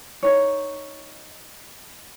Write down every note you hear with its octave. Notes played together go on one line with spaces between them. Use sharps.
D#4 C#5